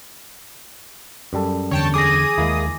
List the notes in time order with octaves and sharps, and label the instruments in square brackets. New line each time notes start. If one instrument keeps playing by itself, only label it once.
[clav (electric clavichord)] F#2 G3 A4
[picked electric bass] E2 D3 [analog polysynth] C#5 G5 A5
[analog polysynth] G#4 D#6 [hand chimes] D6 A#6
[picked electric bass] D#2 [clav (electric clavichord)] G#3 A#3 E4